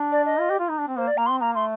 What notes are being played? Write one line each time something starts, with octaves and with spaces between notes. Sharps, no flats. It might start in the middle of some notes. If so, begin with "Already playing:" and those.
Already playing: D4
D5
D#5
F4
G4
F4
D#4
D4
C4
A#3 C5
D5
A#3 A#5
C4 C6
A#3 A#5
A3 C6